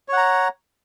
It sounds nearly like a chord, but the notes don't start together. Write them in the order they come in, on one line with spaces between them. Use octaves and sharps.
C#5 F#5 A#5